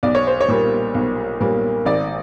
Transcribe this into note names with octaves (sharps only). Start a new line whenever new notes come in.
B1 D5
C#5
C5
C#5
A#2 G3 A#3
B1
A#2 G3 A#3
G#1 D5